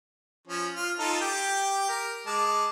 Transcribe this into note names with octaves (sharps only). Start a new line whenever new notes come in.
F3 C#4
F4 F6
D#4 F4 A4
G4 G5
A#4
G#3 A5 D6